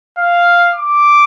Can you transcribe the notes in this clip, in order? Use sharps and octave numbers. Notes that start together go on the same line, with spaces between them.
F5
D6